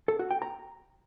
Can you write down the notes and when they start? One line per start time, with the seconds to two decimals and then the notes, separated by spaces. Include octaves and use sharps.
0.08 A4
0.19 F#4
0.31 G5
0.42 A#5